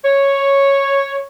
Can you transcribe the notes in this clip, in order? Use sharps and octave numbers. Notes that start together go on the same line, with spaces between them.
C#5